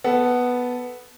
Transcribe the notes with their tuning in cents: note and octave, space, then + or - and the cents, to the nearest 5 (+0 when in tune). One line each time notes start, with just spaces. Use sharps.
B3 +0 A4 -10